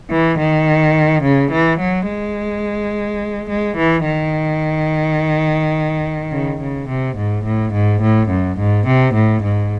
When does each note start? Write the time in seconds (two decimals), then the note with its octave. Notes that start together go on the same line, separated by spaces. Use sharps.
0.10 E3
0.38 D#3
1.23 C#3
1.51 E3
1.79 F#3
2.08 G#3
3.49 G#3
3.77 E3
4.06 D#3
6.32 C#3
6.61 C#3
6.89 C3
7.16 G#2
7.44 A2
7.73 G#2
8.02 A2
8.29 F#2
8.58 G#2
8.87 C3
9.14 A2
9.43 G#2